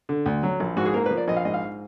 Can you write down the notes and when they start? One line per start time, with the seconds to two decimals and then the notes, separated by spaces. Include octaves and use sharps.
0.09 D3
0.26 D2
0.43 F#3
0.60 A#1
0.77 G#2 F#4
0.85 G#4
0.94 A#3 A#4
1.06 B4
1.11 F3
1.17 D5
1.28 A#1 D#5
1.37 F5
1.45 G#2 D#5
1.54 F5